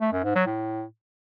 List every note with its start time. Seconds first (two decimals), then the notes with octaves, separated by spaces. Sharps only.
0.01 A3
0.12 F#2
0.24 G#2
0.35 F#3
0.46 A2